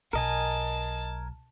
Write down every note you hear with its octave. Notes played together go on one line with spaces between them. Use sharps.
B1 A#4 D#5 G#5 A5